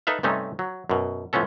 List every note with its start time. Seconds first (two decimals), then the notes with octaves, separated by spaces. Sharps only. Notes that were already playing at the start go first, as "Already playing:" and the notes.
0.07 D#4 A4 B4 E5 F5
0.23 G2 C3 A3 C#4 D#4
0.59 F#3
0.90 F#2 B2
1.33 A2 F3 B3 C#4 A4